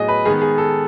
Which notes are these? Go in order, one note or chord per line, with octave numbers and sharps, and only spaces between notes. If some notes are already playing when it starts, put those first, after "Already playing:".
Already playing: A2 F#3 B3 G#4 D#5
B4
D#3 G#3 B3 G#4
G#4
A4